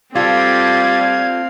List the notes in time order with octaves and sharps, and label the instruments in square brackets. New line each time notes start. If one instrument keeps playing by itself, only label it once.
[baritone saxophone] G3 [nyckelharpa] C4 F5 [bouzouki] F4 A4 [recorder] G#6